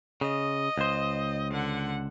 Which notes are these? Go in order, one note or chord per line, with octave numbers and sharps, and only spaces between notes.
C#3 D#5
C#2 C5
D3 F#5